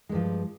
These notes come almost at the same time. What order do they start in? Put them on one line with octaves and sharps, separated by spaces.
G#3 G2 F3